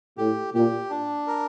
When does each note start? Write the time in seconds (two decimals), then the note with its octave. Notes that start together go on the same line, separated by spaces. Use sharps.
0.17 A2 G4
0.54 A#2 G4
0.90 D4
1.27 A#4